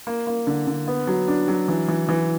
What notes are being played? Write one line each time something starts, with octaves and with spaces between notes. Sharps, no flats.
A#3
A#3
D3
D3
B3
F#3
D4
F#3
E3
E3
E3